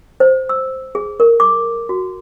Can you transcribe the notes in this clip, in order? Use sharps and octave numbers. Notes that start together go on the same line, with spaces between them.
C5
E6
G#4
A#4
D6
F#4